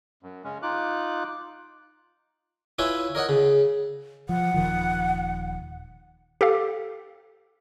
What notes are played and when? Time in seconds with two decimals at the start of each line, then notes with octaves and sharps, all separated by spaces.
0.23 F#2
0.44 C#3 G#3 C#4
0.62 D#4 F4 D6 F#6
2.79 E4 F4 B4 C#5 E5 G#5
3.15 A#4 C#5 D#5 F#5
3.29 C#3
4.29 F3 F#5
4.54 D#1 D#3 F3
6.41 G4 A4 F5